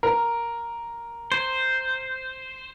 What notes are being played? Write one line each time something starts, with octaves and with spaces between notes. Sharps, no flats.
A#4
C5